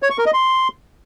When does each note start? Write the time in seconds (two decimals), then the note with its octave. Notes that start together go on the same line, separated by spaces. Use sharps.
0.03 C#5
0.10 C#6
0.18 A#4
0.26 D#5
0.34 C6